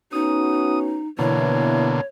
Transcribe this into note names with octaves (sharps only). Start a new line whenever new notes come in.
B3 C#4 D#4 F#4 D#6
B2 D3 E3 A#3 B3 C#5